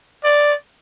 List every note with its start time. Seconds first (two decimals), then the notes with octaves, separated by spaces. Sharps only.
0.24 D5